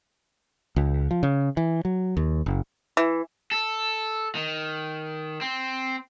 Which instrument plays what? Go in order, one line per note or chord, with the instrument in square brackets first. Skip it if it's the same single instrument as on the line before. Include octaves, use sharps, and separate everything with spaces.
[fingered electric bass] C#2
F3
C#3
E3
F#3
D#2
F#1
[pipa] E3
[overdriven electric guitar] A4
D#3
C4